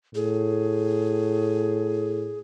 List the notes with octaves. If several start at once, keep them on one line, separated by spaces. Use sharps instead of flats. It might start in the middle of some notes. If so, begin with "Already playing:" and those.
A2 G#4